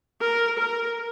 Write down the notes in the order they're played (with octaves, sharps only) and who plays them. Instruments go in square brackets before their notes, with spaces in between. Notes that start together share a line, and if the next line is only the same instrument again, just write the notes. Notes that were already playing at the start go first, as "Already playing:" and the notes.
[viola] A#4
A#4